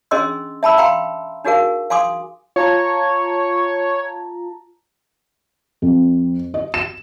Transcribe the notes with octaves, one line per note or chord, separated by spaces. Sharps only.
C#4 D4 G#4 D#5 C6 E6
E5 A5 B5 E6
F5 G5 A#5 C6
D4 D#4 F#4 G#4 A#4 F5
F5 G#5 C6 D6 D#6
F4 C#5 A5 A#5
F2
D#5
E7